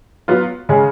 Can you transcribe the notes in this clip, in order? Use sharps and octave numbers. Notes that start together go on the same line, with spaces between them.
F#3 B3 F4
C#3 G#3 C#4 G#4